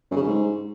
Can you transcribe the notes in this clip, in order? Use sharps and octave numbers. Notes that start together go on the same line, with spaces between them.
F#2
C#3
G2
G#2